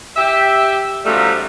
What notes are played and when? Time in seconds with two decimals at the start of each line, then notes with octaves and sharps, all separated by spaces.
0.16 G4 E5
1.05 F#2 F3 G3 A3 D#4